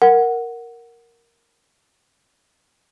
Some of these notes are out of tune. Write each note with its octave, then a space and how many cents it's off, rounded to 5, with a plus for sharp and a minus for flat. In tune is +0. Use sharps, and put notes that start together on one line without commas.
A#4 +0 F#5 +0